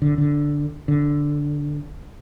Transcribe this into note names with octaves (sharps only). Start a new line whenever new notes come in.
D3
D3
D3